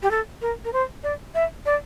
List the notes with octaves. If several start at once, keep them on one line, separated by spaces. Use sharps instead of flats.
G4
A4
A#4
A#4
C5
D5
E5
D5